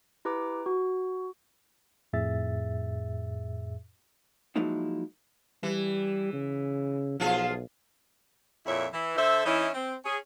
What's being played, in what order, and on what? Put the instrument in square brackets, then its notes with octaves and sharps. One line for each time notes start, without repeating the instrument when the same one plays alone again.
[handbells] E4 G4 B4 A#5 D6
F#4
[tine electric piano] F2 A2 G#4 E5 A6
[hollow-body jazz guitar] F3 F#3 G#3 A#3 D#4 E4
[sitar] E3 [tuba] G3
[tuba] C#3
[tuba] B1 [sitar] F3 F4 G#4
[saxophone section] F2 A#2 E4 C#5 E5
E3
D3 A4 C5 E5
E3 C#4 D#4 E4
C4
C#4 G#4